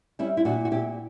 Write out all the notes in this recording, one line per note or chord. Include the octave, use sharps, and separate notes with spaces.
G3 C#4 E4
E4
A#2 D4 F#4
F#4
A#2 E4 G4